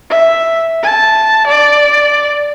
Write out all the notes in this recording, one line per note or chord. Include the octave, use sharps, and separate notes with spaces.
E5
A5
D5